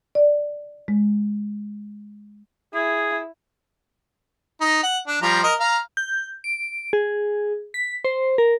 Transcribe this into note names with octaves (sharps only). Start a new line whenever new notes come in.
D5
G#3
E4 G#4
D#4
F#5
D4
F3 G3 A#5
A#4 D#5
F5 A#5
G6
D7
G#4
B6
C5
A#4